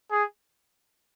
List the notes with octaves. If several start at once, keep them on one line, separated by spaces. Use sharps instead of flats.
G#4